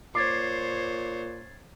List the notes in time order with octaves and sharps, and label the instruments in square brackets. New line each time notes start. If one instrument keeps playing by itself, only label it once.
[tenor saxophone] A#2 [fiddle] C5 C#5 [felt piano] D6 [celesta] G#6 A6 C7